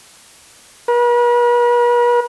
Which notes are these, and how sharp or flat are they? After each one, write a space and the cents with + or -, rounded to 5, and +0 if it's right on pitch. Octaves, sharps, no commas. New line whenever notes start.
B4 -45